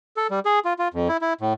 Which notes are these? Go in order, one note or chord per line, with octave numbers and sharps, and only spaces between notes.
A4
G3
G#4
F4
F4
F2
E4
E4
A2